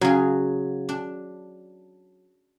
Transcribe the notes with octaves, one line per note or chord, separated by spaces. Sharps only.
C#3 F#3 G#4
D4